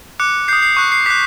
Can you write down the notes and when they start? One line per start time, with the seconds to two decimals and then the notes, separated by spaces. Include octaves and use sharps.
0.20 D6 F#6 C#7
0.48 D#6 G6 C7
0.62 C7
0.77 C#6 F#6
0.92 C7
1.06 D6 F#6 B6